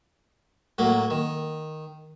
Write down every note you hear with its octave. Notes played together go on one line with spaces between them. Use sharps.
A2 F#3 A#3
D#3